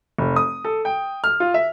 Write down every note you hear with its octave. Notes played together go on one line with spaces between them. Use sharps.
F1
D#6
A4
G5
F6
F4
E5